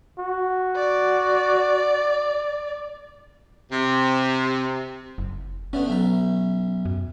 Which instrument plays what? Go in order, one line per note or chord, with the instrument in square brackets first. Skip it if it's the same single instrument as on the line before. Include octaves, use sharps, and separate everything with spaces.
[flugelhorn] F#4
[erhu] D5
[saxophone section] C3
[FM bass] F#1
[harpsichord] D3 A3 B3 [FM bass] C#4
[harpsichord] B1 E5 A#5
[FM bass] F#2